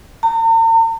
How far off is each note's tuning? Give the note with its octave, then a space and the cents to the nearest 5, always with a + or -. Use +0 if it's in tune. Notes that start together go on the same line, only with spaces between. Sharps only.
A#5 -45